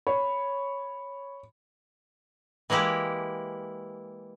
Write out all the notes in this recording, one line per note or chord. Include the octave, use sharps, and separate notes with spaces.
C#5 B5
E3 G#3 A#3 E4 G4